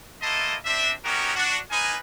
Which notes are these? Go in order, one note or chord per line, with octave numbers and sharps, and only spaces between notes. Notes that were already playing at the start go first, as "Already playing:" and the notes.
A3 A#3 E4 D#5 A5 C6
C4 D4 E5
B3 C#4 D#4 F#4 G4 A#4
D4 F#4
A#3 D#4 B4 G#5